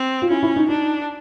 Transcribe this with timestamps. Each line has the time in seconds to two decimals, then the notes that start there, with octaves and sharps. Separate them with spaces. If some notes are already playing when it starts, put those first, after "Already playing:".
Already playing: C4
0.22 F4
0.30 C#4 E4
0.43 E4
0.56 D#4
0.69 D4 D#4